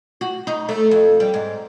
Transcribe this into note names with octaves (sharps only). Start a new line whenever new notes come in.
F#4
D#4
A3
F2
G3
G#2